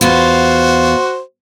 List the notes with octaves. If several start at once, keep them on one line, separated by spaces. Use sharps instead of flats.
E2 F4 F#4 C5